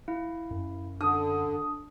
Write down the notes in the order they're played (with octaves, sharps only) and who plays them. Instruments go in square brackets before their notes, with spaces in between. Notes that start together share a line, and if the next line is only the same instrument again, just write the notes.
[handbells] E4 F5
[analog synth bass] F#2
[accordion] D3 [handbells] D4 [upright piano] D#6